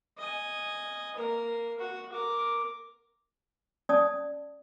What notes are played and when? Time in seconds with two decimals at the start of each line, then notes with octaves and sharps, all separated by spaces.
0.18 D#5 G#5
1.16 A#3 A#4
1.79 F#4
2.12 A#4 D6
3.89 C#4 D5 A5 D#6